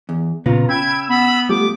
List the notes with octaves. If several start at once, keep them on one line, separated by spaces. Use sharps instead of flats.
E2
A#2 C#3 B3 F4 A#5
C#3 G5 B5 E6 G#6
B3 B5
F3 G3 A3 G4 D6